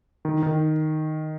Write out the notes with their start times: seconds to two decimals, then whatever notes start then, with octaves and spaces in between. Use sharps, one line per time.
0.25 D#3
0.43 D#3